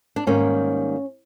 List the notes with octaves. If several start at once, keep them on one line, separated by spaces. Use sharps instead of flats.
D4
G#2 D#3 G3 A#3 C#4